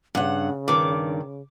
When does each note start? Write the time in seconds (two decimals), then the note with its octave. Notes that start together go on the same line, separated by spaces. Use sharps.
0.15 G2 C#3 F#5
0.68 G2 D#3 D6